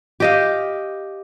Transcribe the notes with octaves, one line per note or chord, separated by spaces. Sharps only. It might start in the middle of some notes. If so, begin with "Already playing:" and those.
G4 D#5 F5